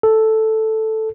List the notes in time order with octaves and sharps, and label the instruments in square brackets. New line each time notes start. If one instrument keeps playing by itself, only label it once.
[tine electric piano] A4